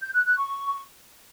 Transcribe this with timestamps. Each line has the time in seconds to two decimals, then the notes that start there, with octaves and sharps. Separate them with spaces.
0.01 G6
0.13 F#6
0.25 F#6
0.37 C#6